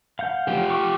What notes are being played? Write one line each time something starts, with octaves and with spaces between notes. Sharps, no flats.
F5 F#5 G6
F3 G4
C#6 D6